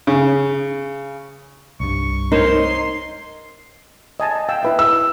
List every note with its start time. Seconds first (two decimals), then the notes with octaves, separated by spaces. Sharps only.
0.07 C#3
1.80 C2 G2 C#6
2.32 D#4 A#4 C5 C#5 C6
4.20 D#5 G#5 A5
4.35 A5
4.49 F5 G5 E6
4.63 E4 B4 E5
4.79 E6